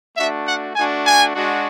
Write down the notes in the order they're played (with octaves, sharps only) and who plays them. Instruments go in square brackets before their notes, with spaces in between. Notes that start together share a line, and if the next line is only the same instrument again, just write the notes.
[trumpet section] A3 D4 F#4 E5
F#5
A3 D4 F#4 G#5
G#5
G#3 D4 F#4